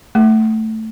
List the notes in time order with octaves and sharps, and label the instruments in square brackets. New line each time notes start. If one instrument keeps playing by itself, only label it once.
[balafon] A3